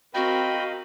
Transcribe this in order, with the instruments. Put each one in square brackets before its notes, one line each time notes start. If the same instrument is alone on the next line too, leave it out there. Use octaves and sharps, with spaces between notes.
[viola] C4 A#4 [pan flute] F#4 [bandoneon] D#5 F5 [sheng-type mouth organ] G5 B5